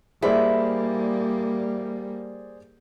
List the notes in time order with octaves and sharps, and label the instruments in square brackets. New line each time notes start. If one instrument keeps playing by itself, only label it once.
[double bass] G3 A#3 [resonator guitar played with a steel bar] E4 [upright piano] G#4 C5 D5